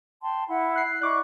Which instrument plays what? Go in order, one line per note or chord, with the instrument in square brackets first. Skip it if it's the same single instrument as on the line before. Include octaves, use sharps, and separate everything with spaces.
[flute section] G5 A5 C6
E4 F#5 B5
[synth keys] F#6 C7
[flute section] E4 D5 D#5 [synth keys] C#6 D6 F#6